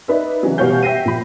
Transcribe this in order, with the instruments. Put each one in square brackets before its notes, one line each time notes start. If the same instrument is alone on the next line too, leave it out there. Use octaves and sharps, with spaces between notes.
[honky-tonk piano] D#4 B4 D5 E5
C#3 E3 F#3
B2 E3 G3 C#5 F5 G6
E5 G5 A#6 C7 D#7
A#2 F3 B5